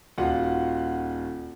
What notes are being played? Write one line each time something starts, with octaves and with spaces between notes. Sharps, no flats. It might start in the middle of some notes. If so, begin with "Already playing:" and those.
D#1 F4 F#4 F#5